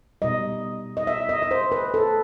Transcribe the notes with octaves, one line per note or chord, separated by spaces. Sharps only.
B2 G3 D#5
D#5
E5
D#5
D#5
C5
B4
A4